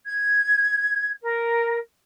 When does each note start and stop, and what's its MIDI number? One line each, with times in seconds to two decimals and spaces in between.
0.05 1.09 92
1.22 1.77 70